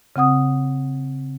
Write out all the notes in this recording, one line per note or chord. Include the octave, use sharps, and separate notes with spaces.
C#3 C4 F#5 D#6